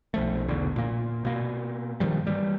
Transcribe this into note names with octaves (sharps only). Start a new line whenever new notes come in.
B1 F3 A3
E1 B1 E2 D3
A#2 A#3
B2 A#3
G2 D#3 F3 G3
E3 G3